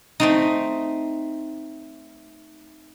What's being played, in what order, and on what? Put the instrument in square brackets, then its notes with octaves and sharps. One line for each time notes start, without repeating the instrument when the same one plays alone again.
[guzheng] A3 C4 D#4